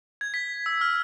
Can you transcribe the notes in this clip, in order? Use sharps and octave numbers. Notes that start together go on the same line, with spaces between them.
G#6
B6
E6
F6